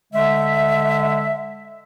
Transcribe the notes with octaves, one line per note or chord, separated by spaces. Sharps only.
D3 G#3 E5